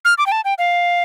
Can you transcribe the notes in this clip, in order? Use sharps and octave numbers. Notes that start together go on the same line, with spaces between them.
F6
D6
G5
A5
G5
F5